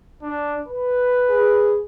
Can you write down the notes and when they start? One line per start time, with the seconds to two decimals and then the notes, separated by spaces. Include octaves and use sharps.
0.22 D4
0.68 B4
1.29 G#4